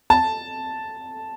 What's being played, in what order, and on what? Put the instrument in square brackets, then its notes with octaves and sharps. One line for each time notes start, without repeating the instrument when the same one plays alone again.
[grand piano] A5